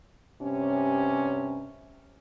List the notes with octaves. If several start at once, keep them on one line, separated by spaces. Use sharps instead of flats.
G2 C3 C#4